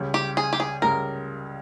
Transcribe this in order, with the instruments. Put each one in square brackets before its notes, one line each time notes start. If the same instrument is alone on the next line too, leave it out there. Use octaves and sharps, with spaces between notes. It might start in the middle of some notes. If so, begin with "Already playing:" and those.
Already playing: [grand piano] C#2 C#3 G3
[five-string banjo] G4
G#4
G4
G#4
[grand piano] C#2 C#3 G3 [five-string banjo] A#4